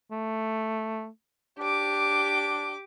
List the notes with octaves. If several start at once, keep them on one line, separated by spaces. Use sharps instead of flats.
A3
D4 G4 D6